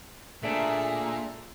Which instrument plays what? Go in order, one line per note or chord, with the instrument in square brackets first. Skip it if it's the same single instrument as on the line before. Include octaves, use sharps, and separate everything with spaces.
[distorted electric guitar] A#2 [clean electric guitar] A3 D4 [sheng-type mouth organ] G#4 E5